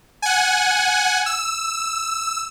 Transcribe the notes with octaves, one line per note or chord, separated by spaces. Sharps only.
F#5 G#5
E6